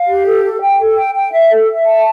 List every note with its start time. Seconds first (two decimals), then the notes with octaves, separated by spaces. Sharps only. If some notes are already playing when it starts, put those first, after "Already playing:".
Already playing: F5
0.08 G4
0.26 A4
0.43 A4
0.61 G5
0.79 A4
0.96 G5
1.15 G5
1.32 E5
1.50 A4
1.67 E5
1.86 A5